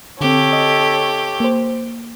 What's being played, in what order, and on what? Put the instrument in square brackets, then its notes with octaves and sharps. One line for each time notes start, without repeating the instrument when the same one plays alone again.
[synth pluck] D3 C4 [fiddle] G4 [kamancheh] A4 C#5
[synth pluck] D#5
A#3 C5